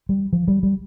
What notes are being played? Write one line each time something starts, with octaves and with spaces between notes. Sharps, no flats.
G3
F3
G3
G3